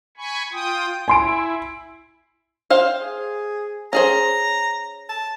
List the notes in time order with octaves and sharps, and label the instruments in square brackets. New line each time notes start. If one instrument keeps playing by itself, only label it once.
[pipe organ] G#5 B5 C#6
F4 G5 D#6
[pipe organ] E4 [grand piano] G#5 C6 D7
[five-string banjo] C5 F5 G5
[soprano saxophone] G#4
[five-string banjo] C#4 G#4 C5 [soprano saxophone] A#5
[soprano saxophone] A5